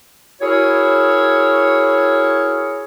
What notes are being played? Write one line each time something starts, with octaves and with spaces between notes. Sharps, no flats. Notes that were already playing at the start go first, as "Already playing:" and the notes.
E4 F#4 G#4 A#4 C#5